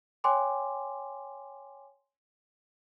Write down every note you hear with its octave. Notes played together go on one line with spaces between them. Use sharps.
C#5 G5 G#5 C6 D6